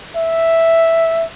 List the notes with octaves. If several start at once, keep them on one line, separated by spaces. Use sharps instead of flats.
E5